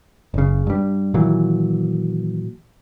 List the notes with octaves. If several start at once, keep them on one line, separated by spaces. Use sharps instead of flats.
F#1 C#3
G2 G3
A#2 D#3 E3 F#3